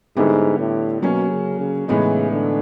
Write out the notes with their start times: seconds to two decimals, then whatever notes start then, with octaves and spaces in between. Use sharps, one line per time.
0.17 G#2 D3 G3 B3 E4 G4
0.59 A2
1.02 B2 F#3 A#3 C#4
1.31 C#3
1.60 C#3
1.88 A2 C#3 E3 G#3 B3 D#4
2.31 D3